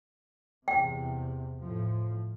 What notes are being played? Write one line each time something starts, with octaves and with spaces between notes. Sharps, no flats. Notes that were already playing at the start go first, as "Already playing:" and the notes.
E2 C3 G5
A2 F3